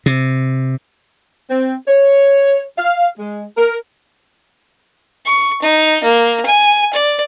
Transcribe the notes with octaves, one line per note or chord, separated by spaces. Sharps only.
C3
C4
C#5
F5
G#3
A#4
C#6
D#4
A#3
G#5
D5